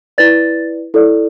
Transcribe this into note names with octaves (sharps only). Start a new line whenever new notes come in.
E4 B4 D5 A6
E4 A4 D5